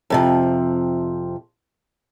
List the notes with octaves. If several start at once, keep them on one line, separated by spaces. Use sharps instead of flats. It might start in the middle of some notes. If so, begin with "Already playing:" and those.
F2 C3 F3